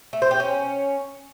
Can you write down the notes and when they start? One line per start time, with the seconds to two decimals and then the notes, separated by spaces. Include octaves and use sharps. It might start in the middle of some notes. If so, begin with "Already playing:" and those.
0.13 A3
0.22 C5
0.31 G4
0.40 C#4